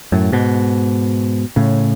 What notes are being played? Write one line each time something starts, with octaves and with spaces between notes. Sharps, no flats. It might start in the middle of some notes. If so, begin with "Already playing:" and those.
F#2 A2
G#2 B2
A2 C#3